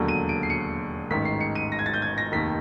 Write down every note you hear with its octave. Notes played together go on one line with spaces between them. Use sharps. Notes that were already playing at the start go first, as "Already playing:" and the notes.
Already playing: E1 D#2 D3 F#3
D#7
D7
C7
C#7
A1 G#2 D#3 B6
C7
C#7
D#7
A#6
G#6
A6
G6
G#6
A#6
F1 D#2 D#3 B6